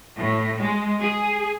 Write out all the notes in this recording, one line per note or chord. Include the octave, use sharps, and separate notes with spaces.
A2
G#3
G#4